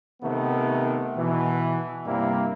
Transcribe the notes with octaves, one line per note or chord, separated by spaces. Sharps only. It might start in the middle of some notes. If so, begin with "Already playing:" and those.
C3 D#3 A3 B3
B2 E3
G2 C3 G3 A#3 E4